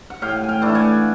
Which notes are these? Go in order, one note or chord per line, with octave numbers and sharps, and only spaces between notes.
F#5
A2 F5 G5
F5 G5 G#5
E3 A3 D4
A5
F#5 G#5